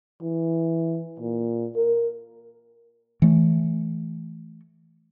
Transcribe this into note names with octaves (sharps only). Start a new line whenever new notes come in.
E3
A#2
A#4
E3 A3